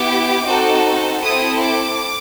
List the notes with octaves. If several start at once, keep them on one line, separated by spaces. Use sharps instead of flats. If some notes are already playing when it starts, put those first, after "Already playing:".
Already playing: B3 E4 G4 D6
C4 D#4 F#4 A4
C4 E4 A4 D#6
D6